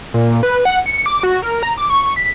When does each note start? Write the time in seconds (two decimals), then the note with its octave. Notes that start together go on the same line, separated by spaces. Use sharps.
0.14 A#2
0.43 B4
0.65 F#5
0.86 C#7
1.06 D6
1.23 F#4
1.42 A#4
1.63 A#5
1.77 D6
1.90 C#6
2.16 B6